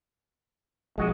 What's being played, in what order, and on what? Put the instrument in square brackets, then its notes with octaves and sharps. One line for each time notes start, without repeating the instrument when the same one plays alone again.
[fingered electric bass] B1 F3 [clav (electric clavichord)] G#3 F#4 D#5